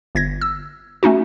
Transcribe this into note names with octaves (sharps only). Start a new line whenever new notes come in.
G1 G#6 A#6
E6
A3 C#4 D#4 F#4